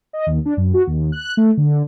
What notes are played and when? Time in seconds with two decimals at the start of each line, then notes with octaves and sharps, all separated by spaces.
0.13 D#5
0.27 D#2
0.45 D4
0.57 F#2
0.74 F#4
0.87 D#2
1.12 F#6
1.37 A3
1.57 D3